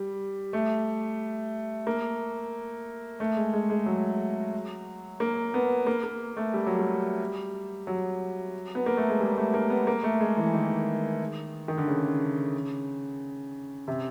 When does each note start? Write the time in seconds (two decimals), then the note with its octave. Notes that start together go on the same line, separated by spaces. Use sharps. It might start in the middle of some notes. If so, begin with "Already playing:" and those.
Already playing: G3
0.53 A3
1.87 A#3
3.20 A3
3.37 G#3
3.53 G#3
3.70 G#3
3.86 F#3
5.20 A#3
5.54 B3
5.87 A#3
6.03 A#3
6.37 A3
6.54 G3
6.66 F#3
6.79 G3
7.87 F#3
8.75 B3
8.86 A#3
8.97 A3
9.09 G#3
9.21 G3
9.37 A3
9.54 A#3
9.70 B3
9.87 A#3
10.04 A3
10.20 G#3
10.37 E3
10.54 D#3
11.68 D#3
11.78 D3
11.88 C#3
13.88 C3